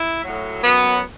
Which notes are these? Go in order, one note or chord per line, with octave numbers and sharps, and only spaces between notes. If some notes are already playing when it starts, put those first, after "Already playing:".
Already playing: E4
A2 F#3
F#2 F#3 B3